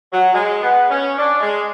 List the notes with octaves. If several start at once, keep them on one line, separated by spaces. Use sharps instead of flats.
F#3
G#3
B3
C#4
D4
G#3